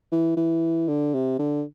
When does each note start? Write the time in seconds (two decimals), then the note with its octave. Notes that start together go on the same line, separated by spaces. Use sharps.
0.12 E3
0.37 E3
0.88 D3
1.14 C3
1.39 D3